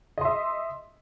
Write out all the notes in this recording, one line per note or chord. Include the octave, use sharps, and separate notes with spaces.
D#5 E5 C6